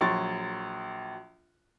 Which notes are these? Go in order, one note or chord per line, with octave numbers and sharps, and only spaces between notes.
A#1 F#3 C6 C#6 A6